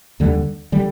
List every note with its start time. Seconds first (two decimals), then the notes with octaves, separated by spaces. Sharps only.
0.20 D#2 D3 G3
0.72 D3 G3